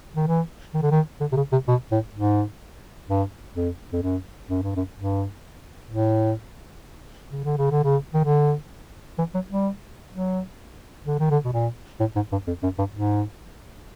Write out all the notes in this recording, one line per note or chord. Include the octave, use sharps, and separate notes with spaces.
D#3
E3
D#3
D3
D#3
D3
C3
C#3
C3
B2
A2
G#2
G2
F2
F2
F#2
F#2
G2
F#2
G2
A2
C#3
D3
C#3
D3
C#3
D#3
D3
E3
F#3
G3
F#3
D3
D#3
D3
B2
A#2
A2
G#2
G2
F2
F#2
G2
G#2